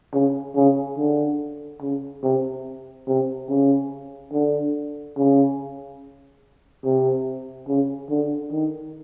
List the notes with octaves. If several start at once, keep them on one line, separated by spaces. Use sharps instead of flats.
C#3
C#3
D3
C#3
C3
C3
C#3
D3
C#3
C3
C#3
D3
D#3